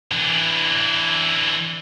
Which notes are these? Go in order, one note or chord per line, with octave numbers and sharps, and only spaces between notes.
E3 D4